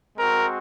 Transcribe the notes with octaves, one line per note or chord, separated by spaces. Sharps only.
G#3 C4 F#4 A#4